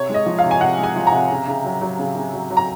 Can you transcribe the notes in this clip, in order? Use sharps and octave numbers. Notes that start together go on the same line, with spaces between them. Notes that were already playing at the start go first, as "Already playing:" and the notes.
Already playing: C3 C#5
G#3 D#5
F3
F5
C3
G#5
C3 F#5
G#3
G#5
F3
A#5
C3
C#3
C#3
F#3
F#3
C#3
C#3
F#3
F#3
A#5